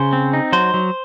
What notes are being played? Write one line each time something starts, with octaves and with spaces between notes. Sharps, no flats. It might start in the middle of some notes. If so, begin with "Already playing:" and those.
Already playing: C#3 C5
C4
D#4
F#3 C5
F#3